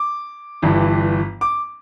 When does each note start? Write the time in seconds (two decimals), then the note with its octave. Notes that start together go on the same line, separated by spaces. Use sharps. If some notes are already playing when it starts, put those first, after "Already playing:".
Already playing: D6
0.62 G1 G2 E3
1.41 D6